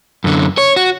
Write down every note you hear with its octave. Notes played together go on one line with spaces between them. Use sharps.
F#2 D3
C#5
F#4